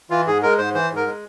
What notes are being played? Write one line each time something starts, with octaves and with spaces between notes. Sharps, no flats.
E3 F4
G#2 G#4
G#3 A#4
G#2 C5
E3 C5
G#2
A#4
G#3